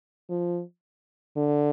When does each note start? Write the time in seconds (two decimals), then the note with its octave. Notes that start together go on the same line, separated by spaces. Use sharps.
0.30 F3
1.36 D3